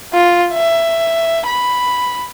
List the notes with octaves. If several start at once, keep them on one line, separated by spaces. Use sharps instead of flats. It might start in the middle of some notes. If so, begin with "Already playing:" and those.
F4
E5
B5